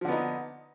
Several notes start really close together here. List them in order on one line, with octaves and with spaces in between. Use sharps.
F3 D3 B3 D#4